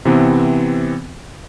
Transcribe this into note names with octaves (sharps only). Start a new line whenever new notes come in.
C3 E3 B3 C4